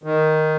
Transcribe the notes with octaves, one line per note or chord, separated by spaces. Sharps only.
D#3